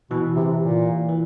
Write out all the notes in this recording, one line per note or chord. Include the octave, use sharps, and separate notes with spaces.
B2 E3
C3
A#2
E3